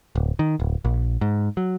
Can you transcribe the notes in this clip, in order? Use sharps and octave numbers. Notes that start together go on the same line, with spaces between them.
D1
D#3
D1
A#1
G#2
F#3